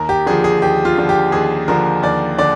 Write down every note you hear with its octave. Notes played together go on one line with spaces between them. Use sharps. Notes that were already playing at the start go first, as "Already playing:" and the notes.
Already playing: D#2 A#4
G4
D3 F3 G#4
G#4
D#2 G4
F4
D3 F3
G4
D#2 G#4
D3 F3 A#4
D#2 D5
D3 D5